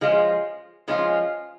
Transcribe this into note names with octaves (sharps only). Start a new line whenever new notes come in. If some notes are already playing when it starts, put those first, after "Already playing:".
F3 G#3 C#4 F4
F3 G#3 C#4 F4